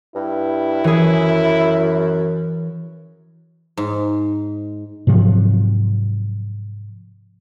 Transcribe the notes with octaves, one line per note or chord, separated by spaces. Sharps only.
G2 E4
F#2 E3 G#4
G#2
G#2 C3 F3 F#3